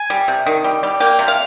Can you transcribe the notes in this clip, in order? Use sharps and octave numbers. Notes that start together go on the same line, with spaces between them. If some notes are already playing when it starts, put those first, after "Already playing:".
Already playing: G#5
G3
C3
D#3
G3
G3
A#3 G5
C3
F5